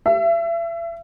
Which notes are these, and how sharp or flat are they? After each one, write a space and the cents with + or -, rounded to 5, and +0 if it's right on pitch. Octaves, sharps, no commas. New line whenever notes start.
E5 +35